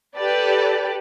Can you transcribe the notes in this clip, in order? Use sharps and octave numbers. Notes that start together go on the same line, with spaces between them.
G4 A4 B4 D5